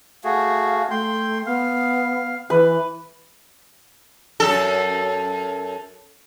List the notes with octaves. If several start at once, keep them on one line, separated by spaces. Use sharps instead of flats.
A3 F#4 G#4 F5
A3 G5 C6
B3 F5
E3 B4
F#2 A4